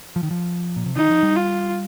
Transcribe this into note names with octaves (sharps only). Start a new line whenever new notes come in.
F3
D#3
F3
A#2
C3
D#3 D#4
F3
G3
F4